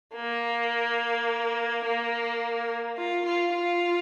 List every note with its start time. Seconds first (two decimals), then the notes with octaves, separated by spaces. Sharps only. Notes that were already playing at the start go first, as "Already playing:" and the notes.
0.15 A#3
1.85 A#3
2.97 F4
3.25 F4
3.54 F4